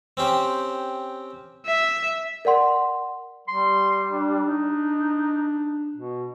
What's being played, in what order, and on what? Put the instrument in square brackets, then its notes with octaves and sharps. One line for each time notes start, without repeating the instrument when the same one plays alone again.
[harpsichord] C4 C#4 G4 C5
[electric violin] E5
[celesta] A#4 D5 F#5 C6
[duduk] G3 [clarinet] C6
[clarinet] D4
[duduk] D#4
B2